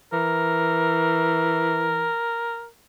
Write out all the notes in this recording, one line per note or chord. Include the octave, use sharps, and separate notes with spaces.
E3 A#4